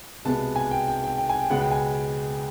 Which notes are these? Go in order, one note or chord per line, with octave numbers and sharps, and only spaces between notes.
C2 B2 G#3 B3 A5
G#5
G5
G5
G5
G5
G#5
G5
C#2 B2 G#3 B3 F#5
G5
G#5